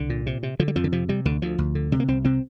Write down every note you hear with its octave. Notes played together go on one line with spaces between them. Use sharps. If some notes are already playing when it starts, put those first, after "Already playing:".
Already playing: C2 D3
A#2
C3
C3
D3 F3
G3
F2 F3
D3
C3 F3
C3 G3
D2 D3
D2 F3
D2
D3
C3 G3
A#3
C2 C4
C3 C4